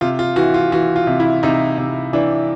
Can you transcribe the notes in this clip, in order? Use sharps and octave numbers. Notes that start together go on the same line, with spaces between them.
C3 F4
F4
E3 F#4
F4
E3 F#4
F4
C3
E4
C3 D#4
C3
E3 D4